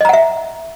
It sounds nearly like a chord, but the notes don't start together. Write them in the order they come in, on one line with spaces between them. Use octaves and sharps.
D#5 A#5 F#5 E5